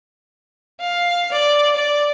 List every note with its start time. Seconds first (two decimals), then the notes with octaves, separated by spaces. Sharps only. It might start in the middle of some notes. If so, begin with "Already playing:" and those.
0.80 F5
1.32 D5
1.77 D5